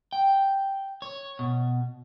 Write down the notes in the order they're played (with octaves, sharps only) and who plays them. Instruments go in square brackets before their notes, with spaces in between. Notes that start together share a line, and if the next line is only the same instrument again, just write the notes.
[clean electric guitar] G5
C#5
B2